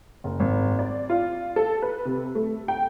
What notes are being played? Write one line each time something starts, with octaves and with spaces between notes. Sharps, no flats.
F#1
G#1
D5
F4
A4
B4
C3
A3
G5